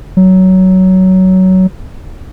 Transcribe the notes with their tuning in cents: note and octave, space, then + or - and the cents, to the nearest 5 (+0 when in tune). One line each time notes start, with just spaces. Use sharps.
F#3 +15